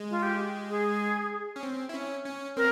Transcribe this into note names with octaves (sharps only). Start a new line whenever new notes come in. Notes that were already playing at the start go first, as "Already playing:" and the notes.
Already playing: G#3
F4
G4
G#4
C#4
C4
E4
C#4
C#4
C4 A#4